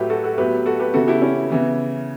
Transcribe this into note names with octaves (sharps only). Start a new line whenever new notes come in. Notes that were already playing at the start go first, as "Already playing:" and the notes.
Already playing: A2 F#3 A3 G4 B4
F#4 A4
F#4 A4
A2 F#3 B3 G4 B4
F#4 A4
G4 B4
C#3 E3 B3 F#4 A4
E4 G4
C#4 E4
C#3 E3 B3